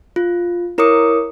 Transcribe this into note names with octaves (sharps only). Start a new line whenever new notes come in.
F4
E4 A#4 C#5 D6 D#6 C#7